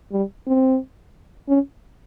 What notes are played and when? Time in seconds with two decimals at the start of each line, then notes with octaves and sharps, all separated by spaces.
0.12 G3
0.47 C4
1.49 C#4